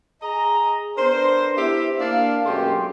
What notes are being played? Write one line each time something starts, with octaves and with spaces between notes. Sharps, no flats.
G#4 D#5 A#5
B3 D4 A#4 C5
E4 G4 E5
A#3 D4 F5
F#2 B2 G#3 A3 G4 C6